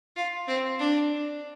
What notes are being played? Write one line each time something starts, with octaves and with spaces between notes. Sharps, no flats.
F4
C4
D4